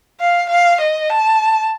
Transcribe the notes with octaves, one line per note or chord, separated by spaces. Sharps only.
F5
F5
D#5
A5